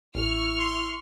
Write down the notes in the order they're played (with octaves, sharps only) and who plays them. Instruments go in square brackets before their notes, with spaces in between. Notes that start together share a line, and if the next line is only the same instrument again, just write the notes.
[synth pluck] A1 [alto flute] E4 [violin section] C#6 F6
[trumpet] C6